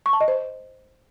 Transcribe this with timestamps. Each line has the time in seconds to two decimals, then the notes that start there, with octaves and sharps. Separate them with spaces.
0.06 C#6
0.13 A5
0.21 D#5
0.28 C5